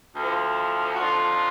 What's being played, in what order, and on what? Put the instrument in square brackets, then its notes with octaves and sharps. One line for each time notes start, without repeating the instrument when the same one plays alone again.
[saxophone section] D2 D3 F3
F#4
F2 D3 F3 D#4 F4